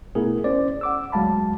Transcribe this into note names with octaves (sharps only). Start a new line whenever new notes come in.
B2 A3 B3 E4 G#4 A#4
C#4 C5 D5
F#5 D6 E6
D2 F#3 G#3 F5 A5 B5